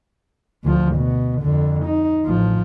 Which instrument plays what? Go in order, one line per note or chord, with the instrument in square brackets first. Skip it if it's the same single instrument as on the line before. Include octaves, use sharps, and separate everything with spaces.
[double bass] D2 F3
B2
F2 D3
D#4
A1 F3